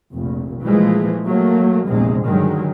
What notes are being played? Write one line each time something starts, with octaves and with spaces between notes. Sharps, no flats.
F1 A#1
A#2 E3 F3 G#3 A3
F#3 A3 A#3
A#1 E2 C3 G#3
G2 D3 D#3 F#3 G#3